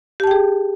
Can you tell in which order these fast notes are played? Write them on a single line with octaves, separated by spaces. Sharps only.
G4 A5 G5 G#4